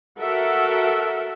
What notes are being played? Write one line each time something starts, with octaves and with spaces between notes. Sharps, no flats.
F#4 A4 A#4 E5 F#5